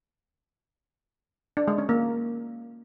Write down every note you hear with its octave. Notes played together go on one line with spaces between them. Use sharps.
D4
G#3
C#4
A#3